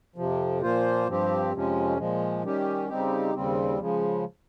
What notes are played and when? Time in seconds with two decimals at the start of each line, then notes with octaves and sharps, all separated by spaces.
0.16 F2 C3 F3
0.61 A#2 F3 A#3 F4 C5
1.07 G2 F3 C4 G4
1.53 F2 C3 F3 G#3 C#4
1.97 A#2 F3 G#3
2.43 D#3 G3 C#4 G4
2.89 C#3 G3 C4 D#4 G4
3.33 D#2 C#3 G3 C4
3.79 C#3 F3 G#3